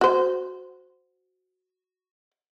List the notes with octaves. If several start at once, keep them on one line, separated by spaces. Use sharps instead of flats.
F#4 C5